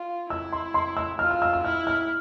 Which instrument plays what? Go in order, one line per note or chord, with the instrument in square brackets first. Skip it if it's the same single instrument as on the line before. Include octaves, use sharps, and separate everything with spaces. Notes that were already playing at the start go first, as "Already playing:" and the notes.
Already playing: [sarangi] F4
[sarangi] E4 [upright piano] E6
[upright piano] C6
C6
E6
[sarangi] F4 [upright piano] F6
[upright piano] E6
E6
E6
[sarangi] E4 [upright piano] F6
[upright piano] F6